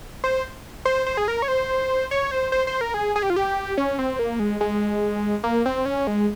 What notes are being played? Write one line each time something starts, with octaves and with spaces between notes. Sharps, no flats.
C5
C5
C5
G#4
A#4
C#5
C5
C#5
C5
C5
C5
A#4
G#4
G#4
G4
F4
G4
C#4
C4
A#3
G#3
G#3
A#3
C4
C#4
G#3